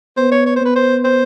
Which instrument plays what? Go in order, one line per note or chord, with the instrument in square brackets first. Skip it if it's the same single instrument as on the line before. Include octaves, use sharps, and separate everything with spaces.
[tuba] B3 [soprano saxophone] C5
[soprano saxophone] C#5
C#5
C5
[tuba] B3 [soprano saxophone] B4
[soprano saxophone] C5
C5